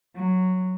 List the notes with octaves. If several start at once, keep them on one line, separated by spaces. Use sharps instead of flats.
F#3